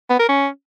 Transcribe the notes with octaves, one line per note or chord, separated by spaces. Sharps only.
B3
A#4
C#4